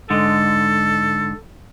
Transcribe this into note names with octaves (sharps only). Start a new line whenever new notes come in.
G#2 D3 G#3 A4